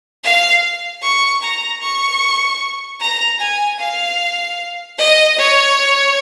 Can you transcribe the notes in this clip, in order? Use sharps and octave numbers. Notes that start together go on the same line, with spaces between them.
F5
C#6
A#5
C#6
A#5
G#5
F5
D#5
C#5